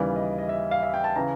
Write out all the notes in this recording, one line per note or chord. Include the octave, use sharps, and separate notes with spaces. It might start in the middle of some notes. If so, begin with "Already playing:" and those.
Already playing: D#2 C#3 E3 G3 D5
D#5
D#5
E5
F5
E5
G5
A5
C#3 E3 A#5